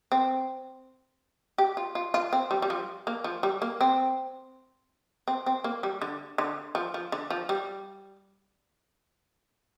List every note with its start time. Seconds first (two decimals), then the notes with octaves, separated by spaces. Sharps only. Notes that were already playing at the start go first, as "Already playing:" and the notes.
0.12 C4
1.58 G4
1.77 F4
1.95 F4
2.14 F4
2.33 C4
2.51 G3
2.62 G3
2.70 F3
3.07 A#3
3.24 F3
3.43 G3
3.62 A#3
3.81 C4
5.28 C4
5.46 C4
5.64 A#3
5.83 G3
6.02 D3
6.38 D3
6.75 F3
6.94 F3
7.12 D3
7.30 F3
7.49 G3